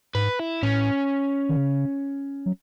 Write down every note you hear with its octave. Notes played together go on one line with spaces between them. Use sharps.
G#2 B4
E4
A2 C#4
D#3
C#3
F#3